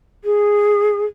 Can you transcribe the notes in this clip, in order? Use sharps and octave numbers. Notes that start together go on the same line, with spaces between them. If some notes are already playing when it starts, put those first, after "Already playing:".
G#4